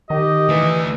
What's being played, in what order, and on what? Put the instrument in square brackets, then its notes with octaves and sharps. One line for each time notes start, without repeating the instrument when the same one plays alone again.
[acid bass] D#3 [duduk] G4 [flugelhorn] D#5
[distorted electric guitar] D3 A3 [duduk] E3